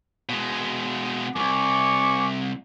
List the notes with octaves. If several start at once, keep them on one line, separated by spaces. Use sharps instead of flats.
B2 G#3
C2 F#2 G#5 C#6 D6